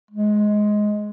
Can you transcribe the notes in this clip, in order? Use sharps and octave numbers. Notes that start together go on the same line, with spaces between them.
G#3